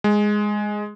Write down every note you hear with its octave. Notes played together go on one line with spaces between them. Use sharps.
G#3